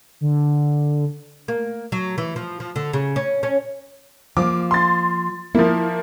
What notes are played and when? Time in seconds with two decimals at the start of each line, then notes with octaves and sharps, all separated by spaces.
0.21 D3
1.48 A#3
1.92 F#3
2.18 E3
2.36 F3
2.60 F3
2.76 D3
2.93 C#3
3.16 C#4
3.43 C#4
4.37 F3 A#3 D6
4.71 C6 A6
5.55 F3 A#3 E4